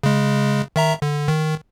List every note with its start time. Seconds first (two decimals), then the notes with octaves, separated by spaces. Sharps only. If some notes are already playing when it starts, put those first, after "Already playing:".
0.03 C#3 G#3
0.76 D#3 E5 A#5
1.02 D3
1.28 D#3